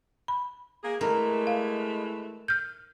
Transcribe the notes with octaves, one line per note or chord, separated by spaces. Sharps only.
B5
A#3 G#4
E3 G#3 A3 A#4
F5
F6 G6